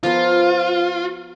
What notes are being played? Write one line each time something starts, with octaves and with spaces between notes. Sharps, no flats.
F3 B3 F4 A#4